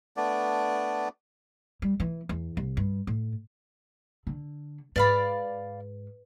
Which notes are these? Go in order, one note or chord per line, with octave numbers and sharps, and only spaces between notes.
A3 B3 D4 D5
G3
E3
E2
C2
G2
A2
D3
G#2 B4 D5 F5 B5